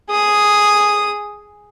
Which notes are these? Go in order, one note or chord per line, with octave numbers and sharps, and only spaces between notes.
G#4 D#6